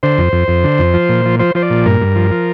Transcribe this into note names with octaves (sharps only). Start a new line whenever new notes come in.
D3 C5
F2
F2
F2
D3
F2
F3
A#2
F3
F3 C5
F3 C5
D5
A#2
G2 A#4
G2
F3
F3